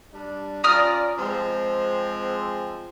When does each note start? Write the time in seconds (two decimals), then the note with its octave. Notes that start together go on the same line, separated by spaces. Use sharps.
0.13 G3 D4
0.64 C#4 F4 D5 A#5 D#6 F6
1.18 F3 G#3 C4